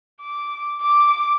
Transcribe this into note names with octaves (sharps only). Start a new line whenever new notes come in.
D6
D6